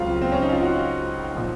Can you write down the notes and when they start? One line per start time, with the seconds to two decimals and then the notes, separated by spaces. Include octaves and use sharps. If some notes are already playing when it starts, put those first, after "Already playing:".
Already playing: C#2 C#3 F#3 C4 F4
0.22 C4
0.32 C#4
0.42 D#4
0.52 F4
0.63 F#4
1.35 A#2 F3